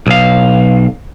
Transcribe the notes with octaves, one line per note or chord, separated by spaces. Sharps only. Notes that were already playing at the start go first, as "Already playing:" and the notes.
B1 F5